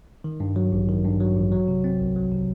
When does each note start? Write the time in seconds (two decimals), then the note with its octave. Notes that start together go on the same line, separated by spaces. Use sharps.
0.24 D#3
0.40 G2
0.56 F#3
0.72 A1
0.89 D#3
1.04 G2
1.20 F#3
1.36 A1
1.52 F#3
1.68 C3
1.84 C4
2.00 C2
2.16 F#3
2.31 C3